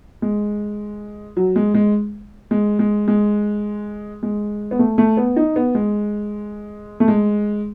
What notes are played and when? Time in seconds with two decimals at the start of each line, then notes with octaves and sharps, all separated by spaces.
0.22 G#3
1.37 F#3
1.56 G#3
1.74 G#3
2.51 G#3
2.79 G#3
3.08 G#3
4.23 G#3
4.71 B3
4.79 A3
4.98 A3
5.17 B3
5.36 D#4
5.56 B3
5.75 G#3
7.00 A3
7.08 G#3